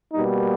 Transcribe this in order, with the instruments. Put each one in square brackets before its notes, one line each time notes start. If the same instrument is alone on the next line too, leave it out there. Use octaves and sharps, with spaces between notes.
[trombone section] B2 G3 A#3 D#4